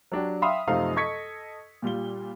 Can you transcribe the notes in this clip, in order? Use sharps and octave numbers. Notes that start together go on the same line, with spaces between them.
F#3 D4 G4
E5 F5 G5 B5 C6 D#6
F#2 C3 F3 A3 D#4 F5
A4 D#5 C#6 G#6 B6 C#7
A#2 G3 F4 G7